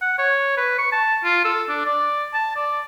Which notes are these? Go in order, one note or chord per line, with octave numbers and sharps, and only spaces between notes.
F#5
C#5
B4
C#6
A5
F4
A4
D4
D5
A5
D5